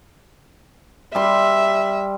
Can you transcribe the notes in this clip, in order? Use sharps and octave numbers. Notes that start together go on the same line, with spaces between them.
G3 E5 C6